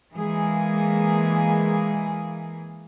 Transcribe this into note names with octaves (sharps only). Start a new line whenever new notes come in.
E3 G#3 A#3 G#4